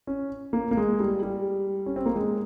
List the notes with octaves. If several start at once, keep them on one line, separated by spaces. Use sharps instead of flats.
C#4
A#3
A#3
G#3
G3
G3
C#4
C4
A#3
G#3